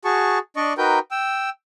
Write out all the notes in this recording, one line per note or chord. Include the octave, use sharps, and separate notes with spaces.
F#4 G#4 A5 C#6
D4 D5 D#5 C#6
D#4 F#4 A#4 B4 G5 G6
G5 E6